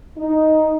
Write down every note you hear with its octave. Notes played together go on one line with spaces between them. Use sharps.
D#4